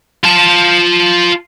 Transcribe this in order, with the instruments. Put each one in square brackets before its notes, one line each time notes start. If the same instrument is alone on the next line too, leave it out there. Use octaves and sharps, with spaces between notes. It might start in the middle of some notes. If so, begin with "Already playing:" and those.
[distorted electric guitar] F4 A5